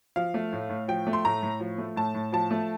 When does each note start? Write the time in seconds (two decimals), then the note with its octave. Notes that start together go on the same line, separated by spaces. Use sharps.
0.16 F3 F5
0.34 A3
0.53 A2
0.70 A2
0.88 F3 G5
1.07 A3
1.13 C6
1.25 A2 A#5
1.43 A2
1.60 F3
1.78 A3
1.96 A2 A5
2.14 A2
2.33 F3 A5
2.51 A3